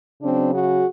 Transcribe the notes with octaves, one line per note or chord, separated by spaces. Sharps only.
C#3 F#3 C4 D4
F#4 G#4